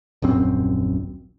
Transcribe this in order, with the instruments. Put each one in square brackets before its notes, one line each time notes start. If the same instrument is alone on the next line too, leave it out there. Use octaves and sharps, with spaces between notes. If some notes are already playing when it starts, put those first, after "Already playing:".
[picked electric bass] D#1 A#1 F#2 C4